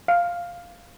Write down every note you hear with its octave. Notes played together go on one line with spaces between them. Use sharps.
F5